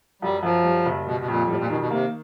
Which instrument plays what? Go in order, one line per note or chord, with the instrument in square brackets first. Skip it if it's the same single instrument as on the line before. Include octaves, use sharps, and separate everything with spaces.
[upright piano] F#2 [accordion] G3
[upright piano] F#2 [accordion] F3
[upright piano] G3
F#1
[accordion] B2 [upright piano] G3
[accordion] B2
[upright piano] F2 [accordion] A#2
[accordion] A2 [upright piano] G3
[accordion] A#2
[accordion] B2 [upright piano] D#3
[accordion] B2
[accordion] C3 [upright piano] A#3